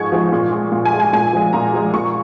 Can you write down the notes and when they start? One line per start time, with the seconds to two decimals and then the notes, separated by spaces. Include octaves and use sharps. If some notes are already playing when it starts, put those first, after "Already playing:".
Already playing: G#2 F3 G#3 C#6 G#6
0.12 F3 G#3
0.32 A#2
0.51 G#3
0.72 A#2
0.85 G#5
0.93 G#3
1.00 G#5
1.13 A#2 G#5
1.33 F3 G#3
1.53 A#2 A#5
1.74 F3 G#3
1.94 A#2 C#6